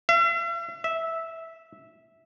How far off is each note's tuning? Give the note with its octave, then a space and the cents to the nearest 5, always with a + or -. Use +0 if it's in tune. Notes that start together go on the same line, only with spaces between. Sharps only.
E5 +45
E5 -10